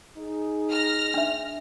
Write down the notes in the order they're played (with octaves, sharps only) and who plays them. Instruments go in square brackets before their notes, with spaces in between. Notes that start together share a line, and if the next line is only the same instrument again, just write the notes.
[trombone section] D#4 G#4
[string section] F6 A#6
[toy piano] D4 E5